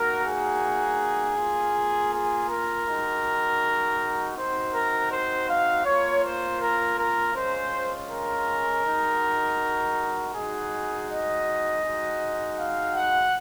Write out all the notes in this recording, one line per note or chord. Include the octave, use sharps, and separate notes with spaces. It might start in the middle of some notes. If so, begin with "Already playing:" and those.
Already playing: A#3 D#4 F#4 A#4
G#4
A#3 F4
G#4
A#4
G#3 D#4 F#4
C4 D#4 F#4 C5
A#4
C5
F5
A#3 F4 C#5
C5
A#4
A#4
G#3 C#4 F4 C5
A#4
G#3 D#4 F#4
G#3 D#4 F#4 G#4
D#5
G#3 D#4 F#4
F5
F#5